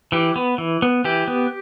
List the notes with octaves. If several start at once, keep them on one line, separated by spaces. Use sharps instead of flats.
E3 G4
B3
E3
B3
E3 G4
B3